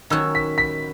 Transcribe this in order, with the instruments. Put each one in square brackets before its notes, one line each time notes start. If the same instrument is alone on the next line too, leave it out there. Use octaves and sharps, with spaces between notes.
[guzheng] D#3 F#3 C#4 F#4 [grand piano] E6
[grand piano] B6
B6